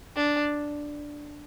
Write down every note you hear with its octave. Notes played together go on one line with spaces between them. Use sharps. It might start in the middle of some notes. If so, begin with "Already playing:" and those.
D4